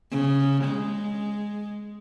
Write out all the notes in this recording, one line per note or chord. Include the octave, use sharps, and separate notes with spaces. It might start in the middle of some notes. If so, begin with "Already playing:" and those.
C#3
G#3